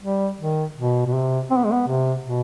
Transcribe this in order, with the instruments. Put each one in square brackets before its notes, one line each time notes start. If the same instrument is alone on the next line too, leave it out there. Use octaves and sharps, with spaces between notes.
[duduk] G3
D#3
B2
B2
C3
C4
B3
G#3
B3
C3
B2